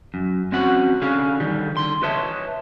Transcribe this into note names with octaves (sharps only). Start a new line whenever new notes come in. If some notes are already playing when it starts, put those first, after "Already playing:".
F#2
C4 C#4 F#4 F#5
D3 C#4 G#4 F5
D3 D#3 G3
D3 C6
B4 C#5 D#5 E5 A5